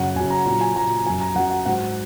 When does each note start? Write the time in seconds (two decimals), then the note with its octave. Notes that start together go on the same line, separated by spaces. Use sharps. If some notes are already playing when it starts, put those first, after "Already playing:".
Already playing: F#2 C#3 F#3 F#5
0.16 F#2 C#3 F#3 G#5
0.30 A#5
0.45 A#2 F#3 A#5
0.61 G#5
0.75 A#2 F#3 A#5
1.05 F#2 F#3 G#5
1.21 A#5
1.35 F#2 F#3 F#5
1.50 F#5
1.66 G#2 F#3 F#5